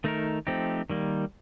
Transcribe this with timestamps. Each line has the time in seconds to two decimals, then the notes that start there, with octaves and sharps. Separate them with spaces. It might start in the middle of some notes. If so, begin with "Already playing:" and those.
0.04 D#3 A3 D#4 A#4
0.47 F3 A3 C4 D#4 G4
0.90 D#3 G3 A#3